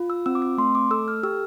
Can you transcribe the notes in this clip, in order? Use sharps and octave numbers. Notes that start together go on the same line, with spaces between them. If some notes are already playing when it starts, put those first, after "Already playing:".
Already playing: F4
E6
C4 E6
D6
E6
A3 C6
D6
A4 E6
F6
G4 E6